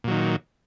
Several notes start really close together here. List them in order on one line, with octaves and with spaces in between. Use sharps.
A#2 F#3 D#3